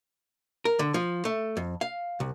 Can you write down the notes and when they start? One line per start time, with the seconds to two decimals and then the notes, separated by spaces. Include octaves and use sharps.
0.65 A#4
0.79 D3
0.94 F3
1.25 A3
1.57 F2
1.81 F5
2.20 C2